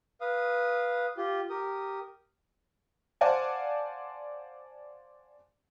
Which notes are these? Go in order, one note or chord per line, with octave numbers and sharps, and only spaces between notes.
B4 F5 D#6
F4 G4
G4 A#4 D#6
C5 D5 F5 F#5 G#5 A5